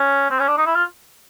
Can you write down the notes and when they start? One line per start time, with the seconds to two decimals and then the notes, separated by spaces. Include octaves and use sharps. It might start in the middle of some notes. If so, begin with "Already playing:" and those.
Already playing: C#4
0.30 C4
0.39 C#4
0.48 D4
0.58 D#4
0.66 E4
0.75 F4